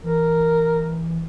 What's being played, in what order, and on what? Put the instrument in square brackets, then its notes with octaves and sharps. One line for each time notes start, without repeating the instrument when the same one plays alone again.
[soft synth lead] E3 [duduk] A#4